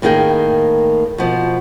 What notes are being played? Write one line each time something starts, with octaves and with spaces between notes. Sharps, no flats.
A2 D#3 A#3 G#4 G5
B2 F3